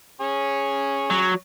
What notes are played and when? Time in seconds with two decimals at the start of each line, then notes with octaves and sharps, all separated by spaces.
0.21 C#4 G#4 C#5
1.10 F#3